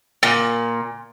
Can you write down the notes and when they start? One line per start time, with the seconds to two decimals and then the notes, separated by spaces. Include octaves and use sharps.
0.23 A#2